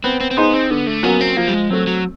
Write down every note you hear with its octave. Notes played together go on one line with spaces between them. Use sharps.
B3 C4
C4
C4
B3 D#4 G#4 C5
C4
D3 B3
A3
F#3 A#3 B3 C#4 F#4
C4
F3 A#3
G3
G#3
F#3 A3 C4
F#3